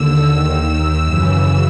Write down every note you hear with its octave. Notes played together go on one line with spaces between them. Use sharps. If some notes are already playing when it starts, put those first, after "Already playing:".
Already playing: D#2 D3 E6
D#2 D#3 E6
F#2 C#3 E3